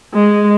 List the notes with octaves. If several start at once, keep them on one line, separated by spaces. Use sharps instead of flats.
G#3